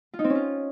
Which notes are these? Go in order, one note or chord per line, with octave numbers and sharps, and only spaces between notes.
F4
D#4
C4
C#4
F4